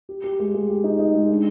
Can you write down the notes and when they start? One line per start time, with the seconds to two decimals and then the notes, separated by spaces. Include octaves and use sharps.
0.09 G4
0.24 G4
0.40 G#3
0.54 G#3
0.69 G4
0.84 D#4
0.99 D#4
1.14 G#3
1.29 D4